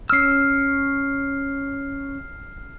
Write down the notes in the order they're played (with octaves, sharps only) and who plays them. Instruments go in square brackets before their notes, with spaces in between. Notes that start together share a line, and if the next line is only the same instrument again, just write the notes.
[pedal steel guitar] C#4 E6 [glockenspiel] F6 C7